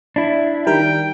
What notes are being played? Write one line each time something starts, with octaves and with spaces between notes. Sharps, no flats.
D4 E4
D#3 G3 A#4 G5